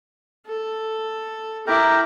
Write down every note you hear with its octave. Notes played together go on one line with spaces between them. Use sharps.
A4
E4 G4 A#4 A#5 D6